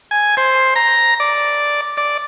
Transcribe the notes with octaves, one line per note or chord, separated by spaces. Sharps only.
G#5
C5
A#5
D5
D5